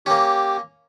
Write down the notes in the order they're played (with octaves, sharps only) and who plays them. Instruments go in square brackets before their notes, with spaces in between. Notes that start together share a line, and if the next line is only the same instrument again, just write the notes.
[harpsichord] A#3 C#4 [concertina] G4